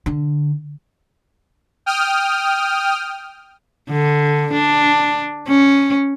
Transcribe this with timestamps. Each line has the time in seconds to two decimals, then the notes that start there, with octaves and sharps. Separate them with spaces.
0.06 D3
1.86 G5 D#6 F6
3.91 D3
4.54 D4
5.48 C#4